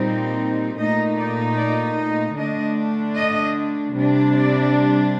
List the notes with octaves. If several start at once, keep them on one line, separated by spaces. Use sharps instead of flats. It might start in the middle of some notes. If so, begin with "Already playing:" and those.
Already playing: A#2 G3 C4 D#4
A#2 A3 D#4 D#5
D5
D5
D#5
D3 A3 D4 D#5
D#5
C3 G3 D4
D5